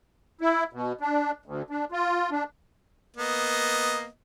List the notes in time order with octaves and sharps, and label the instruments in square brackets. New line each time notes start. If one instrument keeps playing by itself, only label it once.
[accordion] E4
B2
D4
D2
D4
F4
D4
[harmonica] A#3 B3 D#5